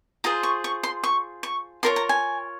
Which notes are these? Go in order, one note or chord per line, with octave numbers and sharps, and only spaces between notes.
F4 G#4 C5 A#5
C#6
C#6
C6
C#6
C#6
F4 A#4 C#5 C6
A#5
G#5